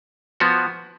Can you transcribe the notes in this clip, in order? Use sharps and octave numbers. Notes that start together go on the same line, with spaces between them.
F3 B3 F#4